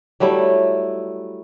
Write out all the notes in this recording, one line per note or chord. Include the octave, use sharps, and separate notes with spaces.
F#3 G3 A3 E4